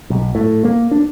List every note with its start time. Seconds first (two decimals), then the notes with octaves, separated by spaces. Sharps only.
0.10 B1
0.35 A2
0.65 A#3
0.91 D4